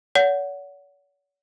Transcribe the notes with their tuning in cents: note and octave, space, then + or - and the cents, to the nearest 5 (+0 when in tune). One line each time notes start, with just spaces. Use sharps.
C#5 +45 F#5 +0